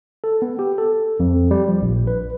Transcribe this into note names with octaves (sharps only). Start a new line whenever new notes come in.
A4
B3
G4
A4
F2
G3
F3
A#1
B4